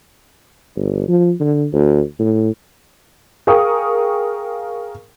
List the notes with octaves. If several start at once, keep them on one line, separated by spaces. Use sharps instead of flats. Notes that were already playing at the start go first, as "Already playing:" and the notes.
G1
F3
D3
D2
A2
G#4 A#4 F5 G5 C#6 D#6